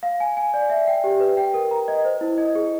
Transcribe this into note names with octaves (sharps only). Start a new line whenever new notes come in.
F5
G#5
G#5
D5
E5
G5
G4
B4
G5
A#4
A#5
D#5
C5
E4
D#5
G#4